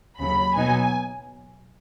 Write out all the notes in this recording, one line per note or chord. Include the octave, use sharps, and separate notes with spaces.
D#2 C#3 F#3 B5
B2 F#3 B3 D#4 G#5